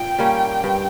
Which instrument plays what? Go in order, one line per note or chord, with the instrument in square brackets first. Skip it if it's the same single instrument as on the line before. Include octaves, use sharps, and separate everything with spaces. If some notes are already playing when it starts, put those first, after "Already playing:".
Already playing: [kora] A#2 [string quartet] G5
[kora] G3 A#3 C#4
G2